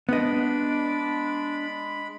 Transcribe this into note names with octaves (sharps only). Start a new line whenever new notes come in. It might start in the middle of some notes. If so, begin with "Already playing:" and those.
G#3 B3 D4 D#5 B5